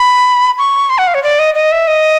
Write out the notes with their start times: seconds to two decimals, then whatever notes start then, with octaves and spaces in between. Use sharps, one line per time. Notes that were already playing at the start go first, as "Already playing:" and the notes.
Already playing: B5
0.58 C#6
0.90 C6
0.98 F#5
1.07 F5
1.14 C#5
1.23 D5
1.39 D#5
1.55 D#5
1.72 E5
1.88 D#5